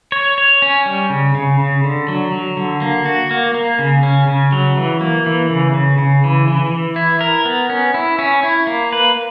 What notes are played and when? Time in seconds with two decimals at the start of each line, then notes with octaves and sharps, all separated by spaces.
0.12 C#5
0.38 C#5
0.62 C#4
0.86 G3
1.10 C#3
1.35 C#3
1.60 C#3
1.84 D3
2.08 F#3
2.32 F#3
2.57 D3
2.82 A#3
3.06 F#4
3.31 A#3
3.54 A#3
3.79 C#3
4.03 C#4
4.28 C#3
4.52 F#3
4.77 E3
5.01 A#3
5.26 E3
5.50 C#3
5.74 C#3
5.98 C#3
6.24 E3
6.48 E3
6.72 E3
6.96 E4
7.21 A#4
7.45 B3
7.70 C#4
7.94 E4
8.19 C#4
8.43 E4
8.67 A#3
8.93 B4